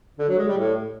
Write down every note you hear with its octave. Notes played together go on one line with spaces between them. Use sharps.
D3
F#3
G#3
G3
A2